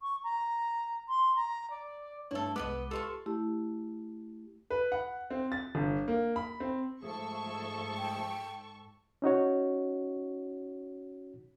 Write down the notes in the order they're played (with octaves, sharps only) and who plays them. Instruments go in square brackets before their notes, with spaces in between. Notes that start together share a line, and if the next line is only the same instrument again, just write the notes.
[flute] C#6
A#5
C6
A#5
D5
[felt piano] G2 A3 [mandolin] E4 A4 [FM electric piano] C#5
[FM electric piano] C2 G#3 [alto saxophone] B3 [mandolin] B4 D5 D#5 [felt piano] D6
[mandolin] F4 B4 C#6 [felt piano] G4 C6 [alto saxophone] A4
[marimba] A3 E4 G4
[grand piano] B4
F#5
C4
A6
G1
A#3
B5
C4
[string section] G#2 A4 C#6 [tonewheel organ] F3 A3 [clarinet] G#4
[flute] G5
[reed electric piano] C#4 D#4 F#4 C#5